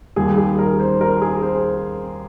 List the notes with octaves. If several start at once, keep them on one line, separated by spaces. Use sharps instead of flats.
D#2 D#3 G3 G#4
G#4
A#4
C5
A#4
G#4
C5